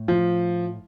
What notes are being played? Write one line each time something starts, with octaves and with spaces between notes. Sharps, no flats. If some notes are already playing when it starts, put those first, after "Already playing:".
Already playing: A2
F3